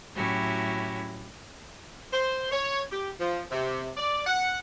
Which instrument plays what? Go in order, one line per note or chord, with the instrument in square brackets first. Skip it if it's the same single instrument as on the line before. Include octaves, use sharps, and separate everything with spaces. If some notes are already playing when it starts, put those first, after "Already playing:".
[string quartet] A2 F#3 C#4 E4 F#4 G4
[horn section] C5
C#5
G4
F3
C3
D5
F#5